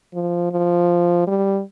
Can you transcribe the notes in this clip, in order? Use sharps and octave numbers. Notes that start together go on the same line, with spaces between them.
F3
F3
G3